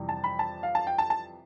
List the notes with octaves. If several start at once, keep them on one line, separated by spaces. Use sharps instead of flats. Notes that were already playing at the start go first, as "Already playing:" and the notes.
Already playing: F2 C3 E3 G3
A5
B5
A5
F5
A5
G5
A5
A5